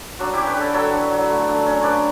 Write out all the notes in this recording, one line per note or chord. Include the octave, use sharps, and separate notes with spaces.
F#3 D4 F#4
C#4 E4 G4
G4 B4
D3 A4 C#5
F#3 A4 C#5
D3
F#3
A3
D3
C#4
C#5
D3 B4 D5